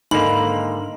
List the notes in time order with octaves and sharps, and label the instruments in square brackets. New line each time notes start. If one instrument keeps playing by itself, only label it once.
[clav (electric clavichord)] G#2 D3 A#3 [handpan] D#4 [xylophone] B5 F#7